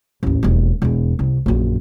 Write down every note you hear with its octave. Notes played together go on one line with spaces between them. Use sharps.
A1 D#2
E1 D#2
E1 E2
C2
A#1 F#2